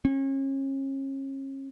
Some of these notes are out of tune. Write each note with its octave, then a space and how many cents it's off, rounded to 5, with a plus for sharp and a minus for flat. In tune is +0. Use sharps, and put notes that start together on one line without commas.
C#4 -35